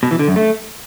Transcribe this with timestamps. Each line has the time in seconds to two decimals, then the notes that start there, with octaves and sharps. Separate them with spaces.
0.03 B2
0.11 E3
0.19 D3
0.28 F#2
0.36 A3